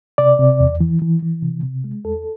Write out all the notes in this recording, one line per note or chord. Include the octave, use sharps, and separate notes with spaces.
C3 D5
C3
E2
E3
E3
E3
C3
C3
G#3
E2 A4